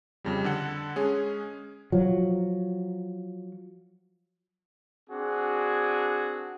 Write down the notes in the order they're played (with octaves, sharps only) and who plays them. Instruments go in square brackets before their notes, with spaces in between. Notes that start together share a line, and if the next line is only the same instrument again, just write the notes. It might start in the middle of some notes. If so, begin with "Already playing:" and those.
[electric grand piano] F2 C#3 G3
D3 A4 F#5
G#3 C#4 G#4
[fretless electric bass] F3 F#3
[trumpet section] C4 D4 F#4 G#4